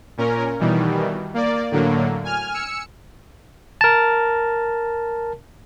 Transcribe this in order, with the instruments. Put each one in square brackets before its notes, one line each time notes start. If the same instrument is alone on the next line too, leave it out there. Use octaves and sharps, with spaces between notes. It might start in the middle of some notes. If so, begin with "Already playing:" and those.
[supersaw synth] A#2 C#4 A#4
B2 D#3 E3 G3
A#3 D5
A2 D3 F#3 A#3
G#5 F6
E6 C#7
[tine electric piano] A#4 A5